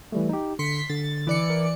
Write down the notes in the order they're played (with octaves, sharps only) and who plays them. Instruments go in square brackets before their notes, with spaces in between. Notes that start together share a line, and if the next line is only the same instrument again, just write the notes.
[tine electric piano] E3 G3 A3
D#4 G4
[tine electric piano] D3 [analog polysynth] C6 B6 C#7
[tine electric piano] D3 [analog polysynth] A6
[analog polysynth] E3 D5 C#7
[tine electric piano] A#4